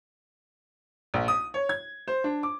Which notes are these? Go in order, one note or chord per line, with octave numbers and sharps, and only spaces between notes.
A#1
D#6
C#5
G#6
C5
D4
D6